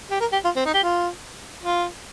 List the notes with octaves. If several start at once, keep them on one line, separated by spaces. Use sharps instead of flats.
G4
A#4
G4
F4
C4
D#4
G4
F4
F4